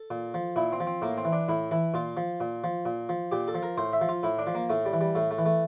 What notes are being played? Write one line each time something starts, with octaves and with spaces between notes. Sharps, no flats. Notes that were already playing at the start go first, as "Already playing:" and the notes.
Already playing: A4
A#2
F3
A#2 E4
C4
F3
C4
A2 A#3
C4
E3
D4
A2 E4
E3 E4
A#2 F4
F3
A#2
F3
A#2
F3
A#2 G4
A4
F3
A#4
A2 C5
E5
F3
F4
A2 E4
D4
F3
A#3
A2 A3
G3
E3
G3
A2 A3
A3
E3
A3